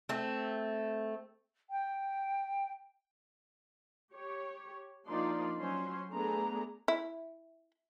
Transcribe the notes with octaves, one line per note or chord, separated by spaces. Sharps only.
A3 C4
G5
G4 C#5
F3 A#3 D4 D#4 D5 C6
F#3 C#4 C5 C6
A3 B3 D4 G#4 A#5
E4